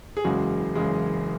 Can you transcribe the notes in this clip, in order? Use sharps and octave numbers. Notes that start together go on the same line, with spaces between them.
G#4
F#1 E2 C#3 G#3 F#4
F#1 E2 C#3 G#3